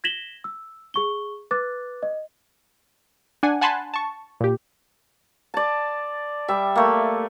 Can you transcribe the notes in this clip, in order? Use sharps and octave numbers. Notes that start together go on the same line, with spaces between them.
G#6 A#6 B6 E7 F#7 G7
E6
G#4 C#6 G7
B4 D6 F#6 A6
D#5
D4 F#5 G#5
F#5 G#5 A5 B5 C6 F#6
A5 C#6
A#2 G4
D5 A5
G3 E5
A3 A#3